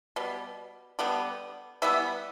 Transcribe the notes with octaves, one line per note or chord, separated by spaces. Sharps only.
B2 G3
D3 G3 B3
E3 G3 B3 E5